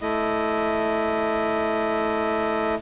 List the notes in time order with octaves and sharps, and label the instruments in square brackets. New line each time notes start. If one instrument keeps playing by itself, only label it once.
[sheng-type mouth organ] A3 E4 D#5